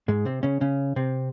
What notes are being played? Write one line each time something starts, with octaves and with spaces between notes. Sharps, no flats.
G#2 G#3
C3 C4
C#3 C#4
C#3 C#4
C3 C4